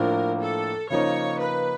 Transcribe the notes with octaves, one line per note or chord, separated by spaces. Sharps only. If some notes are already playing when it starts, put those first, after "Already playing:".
Already playing: A2 F3 A#3 D4 F4 A#4
A4
C#3 F3 A#3 D#4 C#5
B4